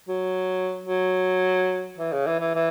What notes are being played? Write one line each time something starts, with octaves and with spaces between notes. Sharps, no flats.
F#3
F#3
E3
C#3
E3
E3
E3